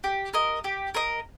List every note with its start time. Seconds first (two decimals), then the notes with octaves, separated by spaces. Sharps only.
0.04 G4
0.33 A#4 D#5
0.64 G4
0.95 A#4 D#5